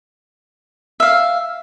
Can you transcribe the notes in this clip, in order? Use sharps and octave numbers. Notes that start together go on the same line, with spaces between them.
E5 F5